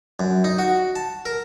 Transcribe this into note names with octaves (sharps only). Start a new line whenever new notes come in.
F#2
D#4
F#4
A5
A#4